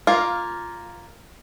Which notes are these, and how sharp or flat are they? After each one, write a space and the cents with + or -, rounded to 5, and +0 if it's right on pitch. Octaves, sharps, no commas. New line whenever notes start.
A#3 +0 F4 +0